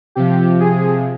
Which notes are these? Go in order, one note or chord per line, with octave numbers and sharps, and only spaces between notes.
C3 F3 G4
G#4